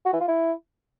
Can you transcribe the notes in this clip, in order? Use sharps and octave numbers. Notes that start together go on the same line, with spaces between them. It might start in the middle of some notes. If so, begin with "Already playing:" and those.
F#4
E3
F4
E4